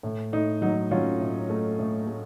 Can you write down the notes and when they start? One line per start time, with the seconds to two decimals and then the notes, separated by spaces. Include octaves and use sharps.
0.03 A2
0.33 A2 D#4
0.62 F#3 D#4
0.91 F#3 C#4 F4
1.20 A2
1.50 A3
1.79 A2
2.07 A3